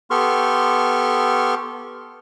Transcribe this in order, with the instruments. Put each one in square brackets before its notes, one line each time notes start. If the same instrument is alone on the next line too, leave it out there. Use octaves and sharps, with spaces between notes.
[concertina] B3 G4 A4 C6 C#6 F6